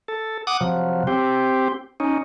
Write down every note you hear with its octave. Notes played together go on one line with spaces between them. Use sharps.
A4
F#5 D6 D#6
C3 F3 F#3
C4 G4
C#4 D#4